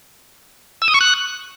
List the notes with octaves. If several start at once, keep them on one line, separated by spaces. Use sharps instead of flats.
E6
D#6
C#6
F#6